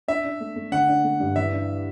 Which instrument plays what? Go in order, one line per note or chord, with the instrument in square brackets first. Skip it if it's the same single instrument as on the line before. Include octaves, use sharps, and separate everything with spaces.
[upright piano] D4 [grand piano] E5
[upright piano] D4
A3
A3
[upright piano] D3 [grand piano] F#5
[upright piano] D4
A3
G2
[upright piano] E3 [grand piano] E5
[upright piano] D4